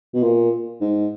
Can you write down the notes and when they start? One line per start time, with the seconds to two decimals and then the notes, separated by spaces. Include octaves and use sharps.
0.14 B2
0.23 A#2
0.81 G#2